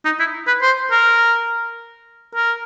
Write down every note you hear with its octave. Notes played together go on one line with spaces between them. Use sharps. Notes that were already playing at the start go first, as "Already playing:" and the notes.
D#4
E4
B4
C5
A#4
A#4